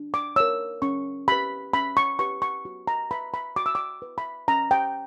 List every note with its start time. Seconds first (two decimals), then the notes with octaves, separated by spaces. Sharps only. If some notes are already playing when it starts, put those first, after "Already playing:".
Already playing: D4
0.14 D6
0.36 A#4 C#5 E6
0.82 C#4 C#6
1.28 G4 B4 B5
1.73 C#4 B5
1.97 C#6
2.19 G4 B4 C#6
2.42 C#6
2.65 F#4
2.87 A#5
3.11 B4 B5
3.34 B5
3.56 F#4 D6
3.66 E6
3.75 D6
4.02 B4
4.18 B5
4.48 C#4 A#5
4.71 G5